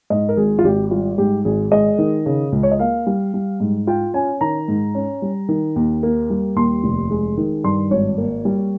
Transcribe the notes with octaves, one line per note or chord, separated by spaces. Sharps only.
G#2 D#5
A#4
G#1 G#4
F4
G#1 G4
G3 F4
G#2 G4
G#1 G#4
G#3 D#5
D#3
C#3
C#2
C#5
D#5
A#3 F5
G3
G3
G#2
F4 G5
C#4 G#5
D#3 A#5
G#2
C#4
G3
D#3
D#2
A#3
G3
D#2 C6
F1
G#3
D#3
G2 C6
G#1 C#5
A#3
G3